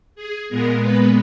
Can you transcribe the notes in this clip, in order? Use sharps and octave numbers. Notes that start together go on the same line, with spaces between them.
G#4
A#2 G#3 B3 A#4
B4